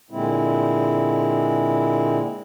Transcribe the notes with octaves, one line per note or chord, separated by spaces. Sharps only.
A#2 D3 G#3 C4 E4